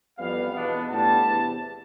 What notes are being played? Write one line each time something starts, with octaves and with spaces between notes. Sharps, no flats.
F2 E3 G3 B3 F5
E2 B2 B3 D4
A2 G3 B3 D4 A5
E2 C3 E3